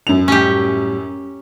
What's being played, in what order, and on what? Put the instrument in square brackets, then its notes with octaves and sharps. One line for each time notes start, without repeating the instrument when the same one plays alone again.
[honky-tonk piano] F#2 F7
[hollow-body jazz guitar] A2 G3 [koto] C#4 G4